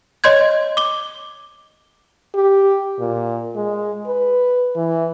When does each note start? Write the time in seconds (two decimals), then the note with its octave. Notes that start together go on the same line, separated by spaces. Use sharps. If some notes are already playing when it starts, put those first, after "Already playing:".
0.24 C#5 D#5 C6 G6 G#6
0.77 D6 G7
2.35 G4
2.99 A#2
3.55 G#3
4.07 B4
4.76 E3